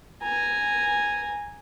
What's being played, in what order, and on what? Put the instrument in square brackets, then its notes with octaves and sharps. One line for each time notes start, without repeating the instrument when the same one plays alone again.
[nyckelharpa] G#5 A#5